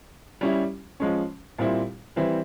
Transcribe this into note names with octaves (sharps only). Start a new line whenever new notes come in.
G3 C#4 E4
F3 G#3 C#4
A#2 G3 C4 E4
E3 G3 C4 E4